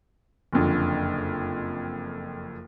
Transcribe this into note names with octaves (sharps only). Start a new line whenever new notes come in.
F#1 F2 D3